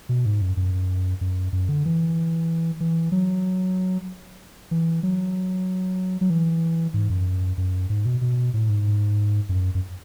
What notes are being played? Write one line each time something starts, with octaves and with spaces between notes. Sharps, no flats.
B2
G#2
F#2
F#2
F#2
F#2
D3
E3
E3
F#3
E3
F#3
F#3
E3
G#2
F#2
F#2
G#2
B2
B2
A2
G#2
F#2
F#2